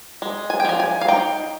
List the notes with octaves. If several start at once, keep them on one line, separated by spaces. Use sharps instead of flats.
G#3
G#5
G5
F3 G#5
G#5
F5
D#4 G5